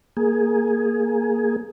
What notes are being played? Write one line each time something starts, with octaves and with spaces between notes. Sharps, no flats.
A#3 G#4